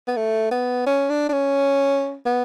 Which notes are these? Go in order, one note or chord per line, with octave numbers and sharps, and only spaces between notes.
B3
A3
B3
C#4
D4
D4
C#4
B3